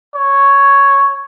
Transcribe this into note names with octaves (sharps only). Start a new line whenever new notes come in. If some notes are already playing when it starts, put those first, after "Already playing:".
C#5